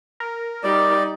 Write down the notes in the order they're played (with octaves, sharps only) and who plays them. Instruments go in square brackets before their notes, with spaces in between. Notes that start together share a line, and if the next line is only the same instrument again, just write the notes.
[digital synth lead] A#4
[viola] G3 D#4 [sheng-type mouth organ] D5